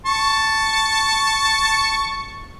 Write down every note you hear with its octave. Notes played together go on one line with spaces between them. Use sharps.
A5 C#6